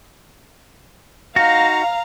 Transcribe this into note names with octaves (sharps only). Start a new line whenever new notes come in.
D#4 F#4 F5 A#5